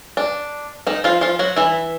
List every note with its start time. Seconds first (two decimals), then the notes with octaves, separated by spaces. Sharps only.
0.17 D4
0.87 D#3 D#4
1.04 F3 F4
1.21 F3 F4
1.39 F#3 F#4
1.56 E3 E4